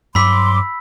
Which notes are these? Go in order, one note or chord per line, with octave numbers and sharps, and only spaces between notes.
G2 F#3 B5 C6 D6 E6 B6